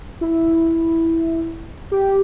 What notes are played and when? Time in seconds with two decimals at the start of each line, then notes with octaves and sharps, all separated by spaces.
0.21 E4
1.92 G4